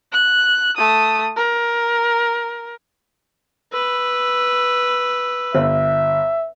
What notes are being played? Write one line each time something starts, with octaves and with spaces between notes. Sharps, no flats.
F#6
A3 D#6
A#4
B4 E6
G1 E5